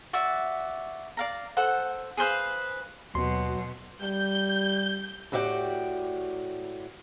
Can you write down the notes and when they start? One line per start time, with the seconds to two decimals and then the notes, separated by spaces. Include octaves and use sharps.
0.13 F#4 D5 E5
1.17 D5 F5 A#5
1.57 A4 C5 F#5
2.17 G#4 B4 C5 F5
3.15 D#2 B2 F#3 C6
4.02 G3 G6
5.32 A2 F#4 G4 D5 E5 G5